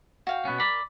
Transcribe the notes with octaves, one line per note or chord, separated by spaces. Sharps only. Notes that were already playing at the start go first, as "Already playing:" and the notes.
F#4 F5 G5
B2 B3 C#4
A#4 D5 B5